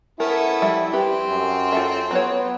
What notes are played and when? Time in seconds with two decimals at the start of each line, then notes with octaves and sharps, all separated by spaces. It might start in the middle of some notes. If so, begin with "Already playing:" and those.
0.20 A3 B3 C#4 E4 A#4
0.62 F3 G3 E5
0.93 C4 G4 B4
1.30 F#2
1.73 F4 A4 E5
2.11 F#3 B3 B4 C#5